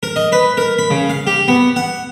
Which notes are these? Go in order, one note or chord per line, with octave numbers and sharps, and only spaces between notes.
A#4
D#5
B4
A#4
B5
C#3
F5
G4
B3
F#5